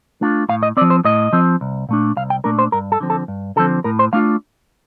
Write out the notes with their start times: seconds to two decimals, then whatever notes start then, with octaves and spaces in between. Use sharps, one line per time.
0.21 A3 D4 F4
0.49 A2 F5
0.63 D#5
0.77 C4 D5
0.81 F3
0.90 C5
1.05 A2 D#5
1.33 F3 C4
1.61 C2
1.89 A#2 A3 D4
2.17 C2 F5
2.30 G5
2.44 A#2 A3 D4 A#4
2.59 C5
2.72 G2 A#4
2.92 A4
3.00 D3 F3 C4
3.10 A4
3.28 G2
3.56 D3 F3 C4 A4
3.84 A2 A#4
3.99 C5
4.13 A3 D4 F4 F5